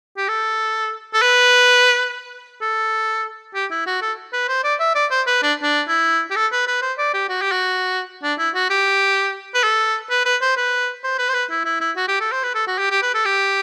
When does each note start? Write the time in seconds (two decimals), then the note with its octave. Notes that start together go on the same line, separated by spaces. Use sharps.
0.17 G4
0.29 A4
1.14 A4
1.22 B4
2.62 A4
3.55 G4
3.71 E4
3.86 F#4
4.02 A4
4.33 B4
4.48 C5
4.64 D5
4.80 E5
4.95 D5
5.11 C5
5.27 B4
5.43 D4
5.63 D4
5.88 E4
6.31 G4
6.36 A4
6.52 B4
6.68 B4
6.82 C5
6.98 D5
7.14 G4
7.29 F#4
7.41 G4
7.52 F#4
8.23 D4
8.39 E4
8.55 F#4
8.70 G4
9.54 B4
9.64 A4
10.10 B4
10.25 B4
10.41 C5
10.57 B4
11.04 C5
11.18 B4
11.29 C5
11.34 B4
11.50 E4
11.65 E4
11.81 E4
11.96 F#4
12.08 G4
12.21 A4
12.32 C5
12.43 B4
12.55 A4
12.67 F#4
12.78 G4
12.90 G4
13.02 B4
13.14 A4
13.25 G4